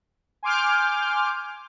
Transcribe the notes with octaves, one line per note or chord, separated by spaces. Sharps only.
G#5 C6 D6 F6 G6